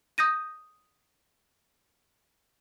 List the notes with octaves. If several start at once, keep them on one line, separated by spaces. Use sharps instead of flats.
D#6 G6 A#6 D#7